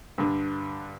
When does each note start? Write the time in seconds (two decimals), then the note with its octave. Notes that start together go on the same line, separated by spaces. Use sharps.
0.18 G2 D3